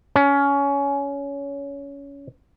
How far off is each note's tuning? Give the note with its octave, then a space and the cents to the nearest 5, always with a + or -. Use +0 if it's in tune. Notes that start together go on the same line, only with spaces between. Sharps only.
C#4 +20